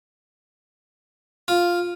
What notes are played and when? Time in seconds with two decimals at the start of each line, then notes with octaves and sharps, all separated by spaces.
1.48 F4